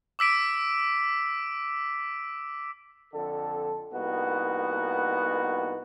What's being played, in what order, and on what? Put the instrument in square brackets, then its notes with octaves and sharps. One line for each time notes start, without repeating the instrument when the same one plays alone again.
[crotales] D6 E6 B6 D7
[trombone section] F2 D3 A4
C2 A#3 B3 D#4 F#4